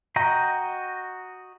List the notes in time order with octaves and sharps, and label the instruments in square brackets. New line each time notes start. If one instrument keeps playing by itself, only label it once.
[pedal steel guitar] F#4 D#5 G5 A#5